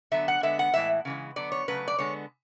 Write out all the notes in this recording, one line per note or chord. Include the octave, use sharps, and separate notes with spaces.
D3 F#3 B3 E5
F#5
D3 G#3 B3 E5
F#5
A2 E3 G#3 E5
C#3 E3 G#3
D3 F#3 B3 D5
C#5
C#3 F#3 A3 B4
D5
D3 G#3 B3 C#5